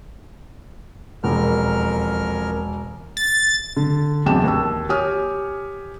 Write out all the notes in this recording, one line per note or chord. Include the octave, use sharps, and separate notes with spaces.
E1 F2 A#3 A#4 F6
A6
D3
B1 E2 C3 G5 A5 E7
D#2 E6
G4 C#5 G#5 D#6 F6